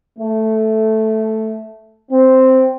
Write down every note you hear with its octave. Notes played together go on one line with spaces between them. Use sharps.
A3
C4